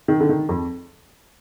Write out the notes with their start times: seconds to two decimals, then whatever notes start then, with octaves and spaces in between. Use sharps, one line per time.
0.08 D#3
0.20 D3
0.29 D#3
0.49 F2